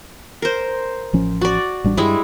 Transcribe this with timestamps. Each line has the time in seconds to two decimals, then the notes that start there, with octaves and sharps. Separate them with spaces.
0.42 A#4 C5
1.13 A1 F3 C#4
1.41 F#4 D5
1.84 A1 G3 D4
1.97 G2 G3 G#3 E4